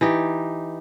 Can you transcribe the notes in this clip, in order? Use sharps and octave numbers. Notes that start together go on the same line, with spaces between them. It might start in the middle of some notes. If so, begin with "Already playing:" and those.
E3 D#4 G4